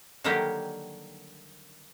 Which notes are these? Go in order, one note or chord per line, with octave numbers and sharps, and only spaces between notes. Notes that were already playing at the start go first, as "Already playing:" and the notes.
D3 D#3 F#3 G3 A#3 G4